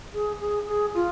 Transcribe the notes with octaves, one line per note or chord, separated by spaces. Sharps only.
G#4
G#4
G#4
F4